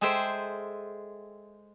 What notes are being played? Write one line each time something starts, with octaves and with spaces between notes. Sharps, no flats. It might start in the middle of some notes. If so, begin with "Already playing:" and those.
G#3 G#4 A4 C5 E5 G5